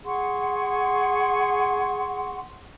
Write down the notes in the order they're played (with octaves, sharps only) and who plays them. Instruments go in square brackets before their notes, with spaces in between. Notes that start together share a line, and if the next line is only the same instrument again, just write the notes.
[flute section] G#4 F#5 C6 C#6